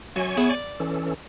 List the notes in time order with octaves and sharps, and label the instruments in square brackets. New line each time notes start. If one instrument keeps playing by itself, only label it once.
[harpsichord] F#2 [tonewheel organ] C#5 G#5 C#6
[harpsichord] B3 E4 G#4
D5
[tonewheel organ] E3 C#4 A4